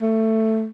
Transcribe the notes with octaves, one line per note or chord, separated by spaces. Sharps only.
A3